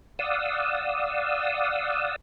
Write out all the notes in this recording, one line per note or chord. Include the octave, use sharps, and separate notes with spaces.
D5 F5 F#5 D#6 E6